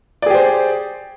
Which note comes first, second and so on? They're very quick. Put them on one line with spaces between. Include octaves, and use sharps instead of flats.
D5 G#4 G4 C5